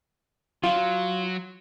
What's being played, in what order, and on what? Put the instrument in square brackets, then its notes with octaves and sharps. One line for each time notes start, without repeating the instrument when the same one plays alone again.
[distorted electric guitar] F#3 [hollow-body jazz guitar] F4